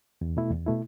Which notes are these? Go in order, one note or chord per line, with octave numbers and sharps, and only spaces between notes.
E2
B2 A3 E4
E2
B2 A3 E4